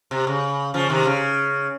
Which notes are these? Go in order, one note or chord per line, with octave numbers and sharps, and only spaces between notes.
C3
C#3
C#3 F3
C3 D#3
C#3